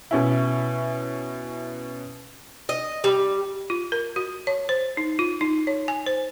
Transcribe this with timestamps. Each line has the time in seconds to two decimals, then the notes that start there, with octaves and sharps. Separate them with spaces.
0.11 B2 C#4 E4
2.69 D#5
3.04 G3
3.70 F4
3.92 A#4
4.16 F#4
4.47 C#5
4.69 C5
4.97 D#4
5.19 F4
5.41 D#4
5.67 C#5
5.88 G#5
6.06 C5